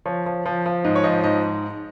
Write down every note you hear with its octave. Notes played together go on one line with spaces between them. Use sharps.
F3 C#5
F3
F3
F3
G#2 D#5
C#5
F3 D#5
G#2 D#5